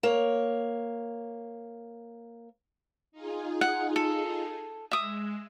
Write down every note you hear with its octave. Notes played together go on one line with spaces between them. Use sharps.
A#3 C#5
D#4 F4 G#4
F#5
A4
G#3 E5 D#6